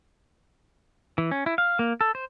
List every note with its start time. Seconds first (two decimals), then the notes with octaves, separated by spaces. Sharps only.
1.18 E3
1.31 C#4
1.46 E4
1.58 F5
1.79 A#3
2.01 A4
2.15 C5